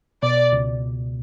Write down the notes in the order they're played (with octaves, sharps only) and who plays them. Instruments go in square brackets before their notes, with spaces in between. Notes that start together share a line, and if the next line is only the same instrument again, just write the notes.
[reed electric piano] B2 [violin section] D5
[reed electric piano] C#2